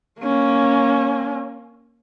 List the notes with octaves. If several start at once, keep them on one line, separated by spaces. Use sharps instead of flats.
A#3 C#4